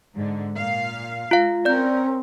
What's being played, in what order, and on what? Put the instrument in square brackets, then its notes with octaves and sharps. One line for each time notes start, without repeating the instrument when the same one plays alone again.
[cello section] G#2 D3
A#2 F5
[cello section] G#3 [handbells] F4 F5
[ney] C4 [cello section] C#4 A#4 [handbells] D5 G6